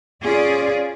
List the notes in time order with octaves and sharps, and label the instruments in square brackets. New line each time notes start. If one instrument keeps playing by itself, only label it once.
[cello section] C#4 F4 G#4 D5